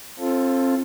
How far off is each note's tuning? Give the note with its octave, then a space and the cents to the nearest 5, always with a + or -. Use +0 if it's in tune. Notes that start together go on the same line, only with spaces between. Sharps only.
C4 +30 F4 -10 A4 +0